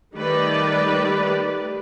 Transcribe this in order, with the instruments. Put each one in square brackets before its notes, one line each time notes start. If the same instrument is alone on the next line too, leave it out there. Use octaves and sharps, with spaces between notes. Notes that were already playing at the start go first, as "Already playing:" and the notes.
[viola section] D#3 G3 A3 G4 B4 D5